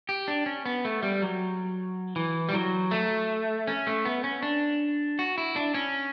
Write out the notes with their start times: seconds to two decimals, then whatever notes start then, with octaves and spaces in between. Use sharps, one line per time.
0.09 G4
0.28 D4
0.46 C#4
0.66 B3
0.85 A3
1.03 G3
1.22 F#3
2.16 E3
2.49 G3
2.54 F#3
2.91 A3
3.67 C#4
3.87 A3
4.05 B3
4.24 C#4
4.43 D4
5.19 F#4
5.38 E4
5.56 D4
5.74 C#4